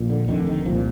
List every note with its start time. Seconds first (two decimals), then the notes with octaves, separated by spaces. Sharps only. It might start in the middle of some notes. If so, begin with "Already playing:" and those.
Already playing: A#1 A#2
0.10 D3
0.28 F1 F2 D3 D#3
0.47 D#3
0.65 C2 A#2 F3